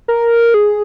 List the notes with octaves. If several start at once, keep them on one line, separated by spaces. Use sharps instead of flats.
A#4
G#4